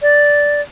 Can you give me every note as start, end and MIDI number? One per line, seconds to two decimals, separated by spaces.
0.02 0.61 74